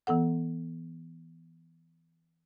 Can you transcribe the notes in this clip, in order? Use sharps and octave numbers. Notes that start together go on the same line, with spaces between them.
E3 B3 A4 F#5